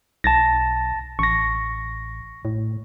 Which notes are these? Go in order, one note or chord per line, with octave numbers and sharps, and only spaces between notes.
B1 A5 A6 A#6
A1 C#6 A#6
A2